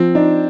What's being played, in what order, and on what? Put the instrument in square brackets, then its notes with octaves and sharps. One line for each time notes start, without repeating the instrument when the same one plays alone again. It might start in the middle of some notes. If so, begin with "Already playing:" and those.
Already playing: [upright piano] F3 [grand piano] C4
[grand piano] D4 [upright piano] D#4